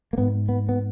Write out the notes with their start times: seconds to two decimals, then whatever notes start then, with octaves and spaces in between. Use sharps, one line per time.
0.13 A#3
0.18 G#2 B3
0.49 B3
0.69 B3